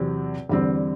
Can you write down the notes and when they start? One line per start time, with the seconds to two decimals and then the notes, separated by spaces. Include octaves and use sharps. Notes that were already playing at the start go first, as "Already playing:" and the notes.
Already playing: E2 C3 F#3 C4
0.49 E2 D3 G3 C4